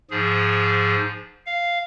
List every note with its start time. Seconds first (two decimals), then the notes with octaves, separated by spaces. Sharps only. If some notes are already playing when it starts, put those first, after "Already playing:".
0.11 G#2 F3 G#4
1.46 F5